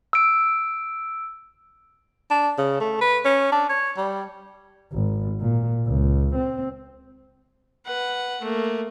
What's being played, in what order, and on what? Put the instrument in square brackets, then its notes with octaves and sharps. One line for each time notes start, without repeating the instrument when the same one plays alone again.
[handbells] E6 D7
[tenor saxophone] D4
C#3
A3
B4
C#4
D4
C#5
G3
[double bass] G#1
A#2
C#2
C4
[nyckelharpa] B4 F#5
A3 A#3